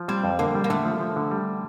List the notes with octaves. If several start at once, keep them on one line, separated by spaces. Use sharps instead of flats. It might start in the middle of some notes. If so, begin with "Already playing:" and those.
Already playing: F3
G3 C4
F2
D3 A#3
G3
A#3
D3 A3
F3
F3
D3
G3